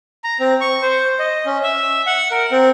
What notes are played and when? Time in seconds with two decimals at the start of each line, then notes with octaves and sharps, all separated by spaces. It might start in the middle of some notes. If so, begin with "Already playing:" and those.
0.24 A#5
0.40 C4
0.61 C#6
0.82 C5
1.19 D#5
1.46 C#4
1.63 E5
2.07 F#5
2.31 A#4
2.52 C4